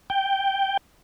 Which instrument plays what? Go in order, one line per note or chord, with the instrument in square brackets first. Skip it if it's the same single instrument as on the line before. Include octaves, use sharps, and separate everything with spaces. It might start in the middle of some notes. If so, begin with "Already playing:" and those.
[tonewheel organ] G5